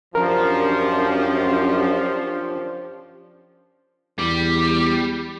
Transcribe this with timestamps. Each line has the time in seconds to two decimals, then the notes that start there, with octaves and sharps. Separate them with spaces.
0.15 F#2 F3 C#4 D4 G4 A#4
4.19 E2 G3